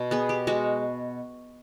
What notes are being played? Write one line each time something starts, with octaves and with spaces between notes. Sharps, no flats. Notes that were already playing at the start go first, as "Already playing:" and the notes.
Already playing: B2
B3 G#4
G4
G#3 F#4